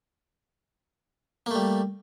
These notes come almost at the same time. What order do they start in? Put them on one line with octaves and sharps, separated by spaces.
A#3 A3 G3